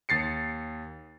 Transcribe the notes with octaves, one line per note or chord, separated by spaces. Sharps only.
D#2 A6 C7 C#7